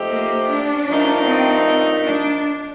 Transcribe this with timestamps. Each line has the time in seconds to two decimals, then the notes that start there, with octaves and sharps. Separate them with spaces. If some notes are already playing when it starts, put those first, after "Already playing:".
Already playing: F3 A3 C4 D#4 G4
0.09 A#3
0.49 D4
0.88 G2 F3 A3 D#4 A#4
1.28 C4
2.07 D4